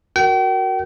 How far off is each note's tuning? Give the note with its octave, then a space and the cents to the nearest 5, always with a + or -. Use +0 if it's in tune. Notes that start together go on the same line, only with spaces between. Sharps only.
F#4 +0 A#4 +0 G5 -40